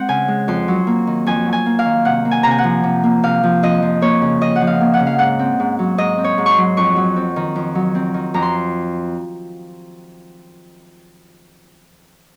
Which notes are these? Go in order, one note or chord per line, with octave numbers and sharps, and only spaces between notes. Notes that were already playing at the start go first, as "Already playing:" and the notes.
Already playing: G#3 C4 F#5
C#3 G#5
G#3
F2 C6
F#3
A#3
D#3
F2 G#5
F#3
G#5
A#3
F5
D#3
C3 F#5
A#3
G#5
C3 A#5
G#5
F#5
F3
C3
A#3
C3 F5
F3
F2 D#5
F3
A#3 C#5
C#3
F2 D#5
F#5
F3
F5
A#3
F#5
C#3
F5
G#2 F#5
C4
G#2
F#3
G#2 D#5
C4
C#5
G#2
C6 C#6
F#3
F2 C#6
F#3
C4
D#3
F2
F#3
C4
D#3
F2 A#5
C6